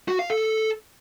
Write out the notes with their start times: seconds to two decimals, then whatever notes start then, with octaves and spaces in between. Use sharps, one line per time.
0.08 F#4
0.19 F5
0.30 A4